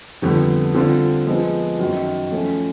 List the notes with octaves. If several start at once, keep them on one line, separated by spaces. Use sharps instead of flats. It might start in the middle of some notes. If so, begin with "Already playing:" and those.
F2 D3 G3 B3
D3 G3 C4 F4
F3 G#3 B3
F#2 D#3 F#3
F3 A3 C#4 F4